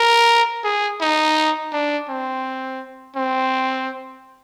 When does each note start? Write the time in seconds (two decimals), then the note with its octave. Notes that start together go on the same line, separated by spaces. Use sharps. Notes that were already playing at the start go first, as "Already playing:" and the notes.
Already playing: A#4
0.64 G#4
1.01 D#4
1.73 D4
2.09 C4
3.15 C4